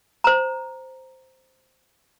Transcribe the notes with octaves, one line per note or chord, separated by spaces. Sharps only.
C5 A#5